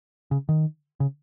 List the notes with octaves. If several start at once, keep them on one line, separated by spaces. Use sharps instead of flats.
C#3
D#3
C#3